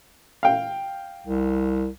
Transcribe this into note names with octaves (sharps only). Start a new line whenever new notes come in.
F5 G5
C2